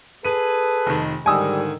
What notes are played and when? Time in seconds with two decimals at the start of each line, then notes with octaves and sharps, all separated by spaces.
0.25 G#4 A4 B4 D#7
0.86 F1 D#3
1.26 G#2 D3 D#3 G3 G#5 D#6 E6